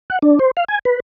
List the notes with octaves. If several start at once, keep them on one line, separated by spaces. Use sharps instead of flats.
F#5
D4
C5
F5
G#5
B4